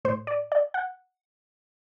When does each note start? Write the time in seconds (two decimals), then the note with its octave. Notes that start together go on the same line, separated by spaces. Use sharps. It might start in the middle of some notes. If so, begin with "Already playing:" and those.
0.05 A2 C5
0.27 D5
0.52 D5
0.74 F#5